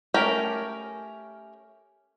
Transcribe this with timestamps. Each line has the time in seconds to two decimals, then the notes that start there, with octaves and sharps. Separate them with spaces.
0.14 A3 C#4 G4 A#4